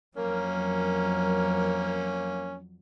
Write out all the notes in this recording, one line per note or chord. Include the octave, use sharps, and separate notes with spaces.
F2 F#3 A#3 C#4 A#4